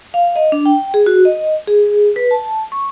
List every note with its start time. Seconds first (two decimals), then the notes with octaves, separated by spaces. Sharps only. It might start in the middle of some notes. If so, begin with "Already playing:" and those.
0.14 F5
0.36 D#5
0.52 D4
0.65 G5
0.94 G#4
1.06 F#4
1.25 D#5
1.67 G#4
2.16 B4
2.31 A5
2.72 C#6